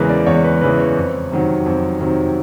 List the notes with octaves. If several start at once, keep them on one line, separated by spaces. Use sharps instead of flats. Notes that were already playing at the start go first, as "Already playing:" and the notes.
Already playing: E2 C#3 E3 G#3 A#4 B4
D5
E2 C#5
B4
C#3 E3 G#3 B4
C#5
F2
C3 D#3 F#3
F2
C3 D#3 F#3